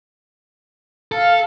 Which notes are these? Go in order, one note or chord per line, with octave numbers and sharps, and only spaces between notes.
A4 F5